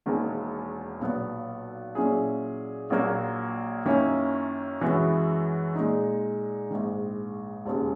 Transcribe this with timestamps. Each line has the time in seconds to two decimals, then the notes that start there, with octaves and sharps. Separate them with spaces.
0.06 E1 E2 D#3 A#3
1.01 B1 A#2 F#3 B3
1.95 A#2 F#3 C#4 E4 G#4
2.90 A#1 A#2 F#3 A#3
3.85 F#2 D#3 A#3 C#4 E4
4.81 F#2 E3 G#3 B3 F#4
5.75 A#2 G#3 D#4
6.70 A#1 G#2 D#3
7.65 E1 D#2 C#3 G#3